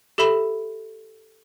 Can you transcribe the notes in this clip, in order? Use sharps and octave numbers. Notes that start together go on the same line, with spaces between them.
G4 A4 E5 B5 E7 G7